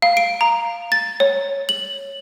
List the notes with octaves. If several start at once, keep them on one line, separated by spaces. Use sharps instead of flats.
F5
D7
A#5
A6
C#5
F#7